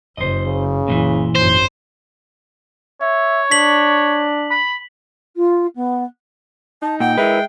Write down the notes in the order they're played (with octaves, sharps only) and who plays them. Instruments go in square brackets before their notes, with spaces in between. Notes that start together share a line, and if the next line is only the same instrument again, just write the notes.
[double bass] F#1 [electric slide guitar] C5 D#5
[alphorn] C#3
[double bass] F#1 [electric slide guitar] A#2 D#3 E3
[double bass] G#1 F#2 [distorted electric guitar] C5
[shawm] C#5 [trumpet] E5
[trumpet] D4 [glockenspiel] B6 F#7
[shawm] B5
[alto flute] F4
B3
[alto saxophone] D#4 [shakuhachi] A5
[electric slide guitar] A#2 [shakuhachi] F#5 [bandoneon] G5
[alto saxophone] G#3 [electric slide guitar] E4 A#4 B4 [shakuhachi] E5